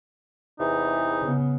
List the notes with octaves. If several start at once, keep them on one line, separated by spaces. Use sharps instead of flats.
E2 C3 E3 D#4
C#3 B3